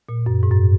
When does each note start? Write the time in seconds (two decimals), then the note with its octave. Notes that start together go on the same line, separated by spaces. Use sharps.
0.09 A#2
0.26 F#2
0.43 G#2
0.51 F#2